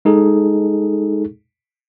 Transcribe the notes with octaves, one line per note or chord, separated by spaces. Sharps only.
G#3 D#4 G#4 A4